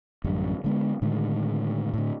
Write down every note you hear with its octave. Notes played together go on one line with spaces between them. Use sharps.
A1 F#2 D3 G3
D3 G#3 B3
A2 D3 D#3 G#3
A2 D3